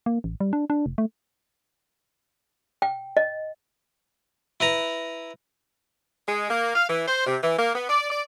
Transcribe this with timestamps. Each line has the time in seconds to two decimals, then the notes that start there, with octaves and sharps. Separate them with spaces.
0.06 A#3
0.24 A1
0.40 G3
0.53 D4
0.70 D4
0.86 F1
0.98 A3
2.82 G5
3.17 D#5
4.60 E4 B4 A#5
6.27 G#3
6.50 A#3
6.75 F5
6.88 E3
7.07 C5
7.26 C3
7.42 E3
7.58 A#3
7.74 B3
7.88 D5
8.10 D5